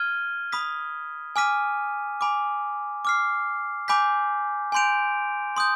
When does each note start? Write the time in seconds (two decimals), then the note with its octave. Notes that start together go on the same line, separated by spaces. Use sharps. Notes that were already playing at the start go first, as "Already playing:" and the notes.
Already playing: F6 G#6 D#7 G7
0.52 B5 D#6 B6
1.36 G#5 D6 F6 B6 D#7
2.21 G#5 B5 D6
3.05 D6 F6 C7
3.88 G#5 B5 D6 G6 B6
4.72 G#5 C6 G6 D7 F7
5.57 C6 D#6 G6